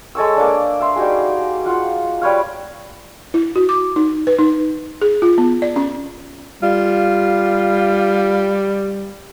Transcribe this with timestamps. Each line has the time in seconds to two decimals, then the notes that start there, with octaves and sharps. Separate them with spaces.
0.15 G#3 A4 C#5 E6
0.37 A#3 D4
0.81 E5 C6
0.96 G3 D#4 F#4 G#4
1.65 F4 F#5
2.22 G3 B4 C#5 F5
3.34 E4
3.56 F#4
3.69 D6
3.96 D#4
4.27 B4
4.39 D#4
5.02 G#4
5.22 F4
5.38 B3
5.62 D5
5.76 C#4
6.63 G3 F4